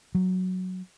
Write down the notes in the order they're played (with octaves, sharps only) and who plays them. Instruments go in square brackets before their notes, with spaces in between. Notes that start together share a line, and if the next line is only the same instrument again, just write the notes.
[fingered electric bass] F#3